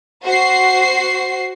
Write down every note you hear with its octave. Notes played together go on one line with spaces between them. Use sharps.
F#4 C5 C7